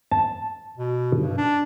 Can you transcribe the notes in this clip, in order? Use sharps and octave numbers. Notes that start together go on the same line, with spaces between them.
A5
B2
G2
D4